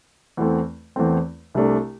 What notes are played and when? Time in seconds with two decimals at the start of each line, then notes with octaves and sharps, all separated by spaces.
0.37 E2 E3 A3 C4
0.96 E2 E3 A3 C4
1.54 C2 C3 A3 D4